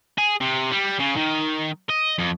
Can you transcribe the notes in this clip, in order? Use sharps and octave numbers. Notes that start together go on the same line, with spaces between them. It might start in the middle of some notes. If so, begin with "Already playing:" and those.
G#4
C3
G3
C#3
D#3
D#5
F2